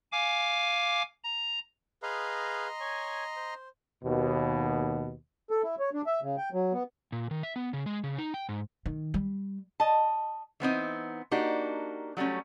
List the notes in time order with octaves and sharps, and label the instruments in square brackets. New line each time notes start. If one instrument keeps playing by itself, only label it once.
[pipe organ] F5 G#5 D6
A#5
[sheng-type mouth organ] G#4 B4 F5 [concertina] D#5 A#5 C6
[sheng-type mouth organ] C#5 G#5
C5
[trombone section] D#2 B2
[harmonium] A4
E4
C#5
D4
E5
C#3
G5
F#3
B3
[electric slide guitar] A#2
D#3
E5
B3
C#3
G#3
C#3
D#4
G5
G#2
[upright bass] D#3
G3
[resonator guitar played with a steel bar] D#5 A5
E3 B3 C4 D#4
A#3 D4 D#4 F#4 G4
F#3 G3 A3 C#4